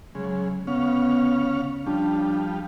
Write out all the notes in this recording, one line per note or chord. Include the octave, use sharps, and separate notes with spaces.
C#3 F#3 G#3
C#3 B3 C#4 F5
F3 G3 D4